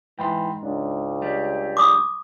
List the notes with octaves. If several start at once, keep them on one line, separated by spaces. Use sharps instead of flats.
G#2 E3 G5 B5 C6
C#2 D4
G3
D6 D#6